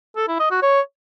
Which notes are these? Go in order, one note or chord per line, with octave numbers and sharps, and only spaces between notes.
A4
E4
D#5
F#4
C#5